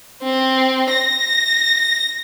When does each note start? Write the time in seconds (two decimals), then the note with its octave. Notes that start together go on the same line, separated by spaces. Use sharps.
0.23 C4
0.91 A#6